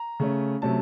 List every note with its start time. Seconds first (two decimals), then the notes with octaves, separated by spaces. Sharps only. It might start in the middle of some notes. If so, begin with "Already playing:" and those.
Already playing: A#5
0.20 C#3 A3 C#4
0.62 C3 F#3 A3 C#4 A5